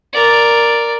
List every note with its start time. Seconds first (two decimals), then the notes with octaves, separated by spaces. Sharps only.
0.12 A#4 D5